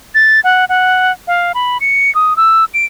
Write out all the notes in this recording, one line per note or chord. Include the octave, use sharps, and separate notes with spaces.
A6
F#5
F#5
F5
B5
C#7
D#6
E6
D7